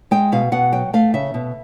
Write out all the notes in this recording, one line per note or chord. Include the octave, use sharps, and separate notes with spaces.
G#3 G5
B2 F5
B2 F#5
F#3 G5
A3 F5
C#3 E5
B2